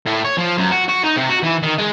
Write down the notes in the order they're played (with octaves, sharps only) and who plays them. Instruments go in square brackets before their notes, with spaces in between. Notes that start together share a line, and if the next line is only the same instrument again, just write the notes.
[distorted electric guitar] A2
C#5
F3
F#2
F#4
F#4
D#4
C3
F#4
E3
D#3
G#3